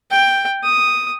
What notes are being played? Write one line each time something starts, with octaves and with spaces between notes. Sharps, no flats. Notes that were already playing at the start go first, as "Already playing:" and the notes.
G5
D#6